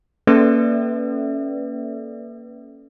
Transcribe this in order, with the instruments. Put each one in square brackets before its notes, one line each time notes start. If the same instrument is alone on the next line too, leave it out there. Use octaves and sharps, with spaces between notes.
[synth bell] A#3 C#4 A4 B4 D5 E5